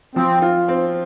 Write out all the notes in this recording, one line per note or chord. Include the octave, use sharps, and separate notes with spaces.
F3 C4
F4
C4